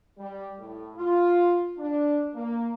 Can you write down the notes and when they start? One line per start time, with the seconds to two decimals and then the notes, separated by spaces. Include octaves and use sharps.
0.18 G3
0.60 A2
0.97 F4
1.78 D4
2.34 A#3